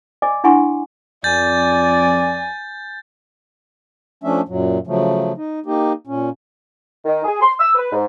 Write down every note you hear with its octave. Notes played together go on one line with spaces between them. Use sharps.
D5 D#5 G#5 D6
D4 E4 F#5 G#5 C6 C#6
F2 D5 G#5 G6 A6
F3 A3 C#4 D4 E5
F#2 A#2 F#3
C#3 F3 F#3 A3
D#4
A#3 D#4 G4
A#2 C#4
D#3
G#4
C6
E6
B4
G#2